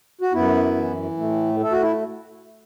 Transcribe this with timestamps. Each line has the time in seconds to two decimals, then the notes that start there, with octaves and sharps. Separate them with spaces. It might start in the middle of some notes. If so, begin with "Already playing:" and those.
0.21 F#4
0.33 F#2 B3 E4
0.76 E3
1.18 A2 A3
1.60 A3 A4
1.72 F#4
1.82 E4